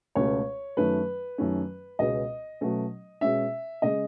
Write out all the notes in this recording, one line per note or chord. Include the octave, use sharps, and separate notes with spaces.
C#2 B2 A3 C#4 C#5
F#2 D#3 A3 C#4 B4
F#2 D#3 A3 C#4
C#2 B2 G#3 C#4 D#5
B2 F#3 A3 C#4
B2 G#3 C#4 E5
C#3 G#3 D#5